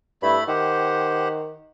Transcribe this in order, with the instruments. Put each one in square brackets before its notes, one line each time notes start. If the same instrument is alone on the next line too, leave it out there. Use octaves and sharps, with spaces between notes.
[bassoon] G2 [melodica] A3 E4 B5
[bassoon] D#3 [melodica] G4 C5 F#5